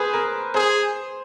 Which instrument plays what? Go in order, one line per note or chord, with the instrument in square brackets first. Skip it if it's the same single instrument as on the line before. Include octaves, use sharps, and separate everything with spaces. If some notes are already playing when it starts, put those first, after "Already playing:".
Already playing: [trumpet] G#4 [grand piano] B4 C5
[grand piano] A#4
[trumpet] G#4 [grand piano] C5